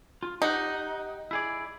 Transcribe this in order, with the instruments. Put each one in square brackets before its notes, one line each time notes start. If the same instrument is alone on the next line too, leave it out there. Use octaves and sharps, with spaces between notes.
[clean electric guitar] F4
[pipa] D#4 [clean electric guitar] G4 F#5
[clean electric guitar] E4 G#4 D5